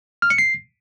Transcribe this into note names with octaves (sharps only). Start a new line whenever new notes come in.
F6
C#7
C7